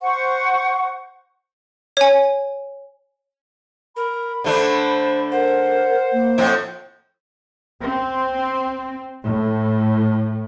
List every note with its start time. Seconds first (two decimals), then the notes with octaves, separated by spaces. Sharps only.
0.02 C5 F#5 C#6
1.97 C#5 G#5
3.96 A#4 B5
4.44 D3 A3 D4 C5
5.32 A#4 C5 F#5
6.12 A#3
6.38 F2 A2 C4
7.80 C4
9.24 A2